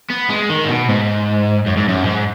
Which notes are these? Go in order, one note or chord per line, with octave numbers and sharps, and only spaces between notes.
B3
G#3
D#3
G#2
B2
G#2
F#2
G#2
F#2
G#2